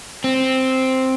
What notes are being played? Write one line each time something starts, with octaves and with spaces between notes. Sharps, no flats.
C4